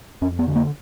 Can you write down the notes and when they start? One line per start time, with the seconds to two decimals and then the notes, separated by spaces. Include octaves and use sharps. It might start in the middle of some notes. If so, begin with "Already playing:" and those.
0.21 F2 C#4
0.39 B3
0.47 D3
0.56 A#3